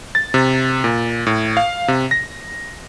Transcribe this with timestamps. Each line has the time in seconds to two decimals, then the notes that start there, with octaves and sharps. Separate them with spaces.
0.15 A6
0.34 C3
0.84 A#2
1.27 A2
1.57 F5
1.88 C3
2.11 A#6